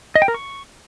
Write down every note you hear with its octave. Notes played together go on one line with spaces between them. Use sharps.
D#5
G5
A#4
C#6